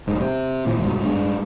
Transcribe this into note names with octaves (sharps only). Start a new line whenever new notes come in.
F1 G#2
C3
A#2 E3 F3
C2 G#2 B2
G2 G#3 D4